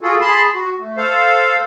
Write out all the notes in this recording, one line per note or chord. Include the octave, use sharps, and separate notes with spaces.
F4 F#4 G#4 A4
G#4 A5 B5 C6
F#4
A3
A4 C5 F5